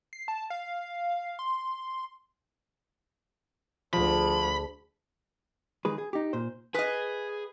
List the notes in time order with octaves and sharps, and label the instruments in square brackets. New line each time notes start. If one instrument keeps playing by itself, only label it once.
[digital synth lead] C7
A5
F5
C6
[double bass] D2 [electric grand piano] F3 [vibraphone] G#4 A5 [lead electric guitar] B5
[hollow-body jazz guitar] D#3 G#3 G#4 B4
G#4
D#4 G4
A#2 C5
[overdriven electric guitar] G#4 G#5 [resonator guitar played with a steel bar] B4 D#5